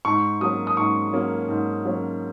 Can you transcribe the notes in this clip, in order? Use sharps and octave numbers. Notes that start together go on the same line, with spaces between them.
G#2 C#6
F#3 A#3 C#4 D#6
D#6
G#2 C#6
F#3 A#3 C#4
G#2
F#3 A#3 C#4